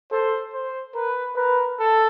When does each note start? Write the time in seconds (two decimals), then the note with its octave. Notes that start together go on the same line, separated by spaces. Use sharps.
0.12 A4 C5
0.53 C5
0.95 A#4 B4
1.36 A#4 B4
1.79 A4